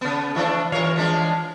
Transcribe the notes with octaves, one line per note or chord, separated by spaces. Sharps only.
C#3 B3
A2 E3 D4
G2 E3 F4 A#4 C#5 F5
F3 G#3 D4